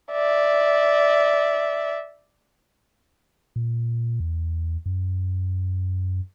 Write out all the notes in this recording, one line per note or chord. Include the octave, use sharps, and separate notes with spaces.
D5 E5
A#2
E2
F#2